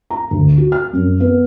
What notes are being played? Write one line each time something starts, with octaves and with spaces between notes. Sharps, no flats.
A#5
D2
F#4
F6
F#2
B3